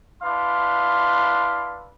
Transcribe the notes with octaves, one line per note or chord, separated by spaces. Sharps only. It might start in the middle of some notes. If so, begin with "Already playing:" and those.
D4 E4 B4 F5 C6